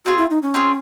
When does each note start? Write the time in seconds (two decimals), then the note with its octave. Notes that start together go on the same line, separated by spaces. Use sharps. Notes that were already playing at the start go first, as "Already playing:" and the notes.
0.05 C4 F4 F#4 G#4
0.18 E4
0.30 D#4
0.43 C#4
0.54 C4 F4 G#4